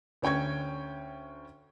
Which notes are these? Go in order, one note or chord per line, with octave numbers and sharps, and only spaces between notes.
D2 C#4 G5 C#6 G#6